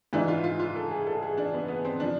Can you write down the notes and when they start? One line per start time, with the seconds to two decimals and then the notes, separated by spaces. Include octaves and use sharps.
0.13 G#2 E3 D4
0.28 F4
0.44 F4
0.60 F4
0.76 A4
0.91 G#4
1.07 A4
1.22 G#4
1.37 D4
1.54 B3
1.68 B3
1.85 C4
2.00 F3 D4